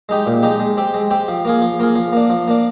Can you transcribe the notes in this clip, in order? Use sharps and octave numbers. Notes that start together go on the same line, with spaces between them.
G#3 D#4 G4
A#2
G#3 D#4 G4
G#3
C4 G4
G#3
C4 G4
F3
A#3 F4 G#4
F3
A#3 F4 G#4
F3
A#3 D4
F3
A#3 D4